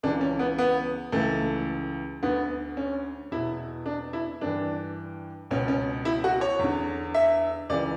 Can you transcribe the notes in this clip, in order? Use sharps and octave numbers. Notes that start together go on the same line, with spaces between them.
C#2 C#3 E3 D4
C#4
B3
B3
C#2 C#3 E3 A3
D2 D3 B3
C#4
E2 B2 E4
D4
E4
G2 E3 D4
C#2 B2 C#4
C#4
E4
F#4
C#5
E2 D3
E5
C#2 C#3 E3 D5